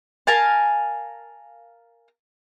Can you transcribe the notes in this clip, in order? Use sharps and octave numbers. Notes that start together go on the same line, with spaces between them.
A#4 F5 G#5 A5